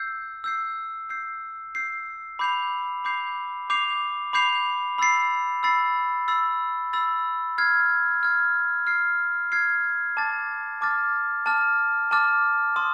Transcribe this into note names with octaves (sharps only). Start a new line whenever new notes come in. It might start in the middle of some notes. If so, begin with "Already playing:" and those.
Already playing: E6 G6 C7
E6 G6 C7
E6 G6 C7
E6 G6 C7
B5 D6 G6 C7 F7
B5 D6 G6 C7 F7
B5 D6 G6 C7 F7
B5 D6 G6 C7 F7
B5 E6 A6 C7
B5 E6 A6 C7
B5 E6 A6 C7
B5 E6 A6 C7
F6 G#6 C7
F6 G#6 C7
F6 G#6 C7
F6 G#6 C7
A5 D6 F6 A6
A5 D6 F6 A6
A5 D6 F6 A6
A5 D6 F6 A6
A5 C6 D#6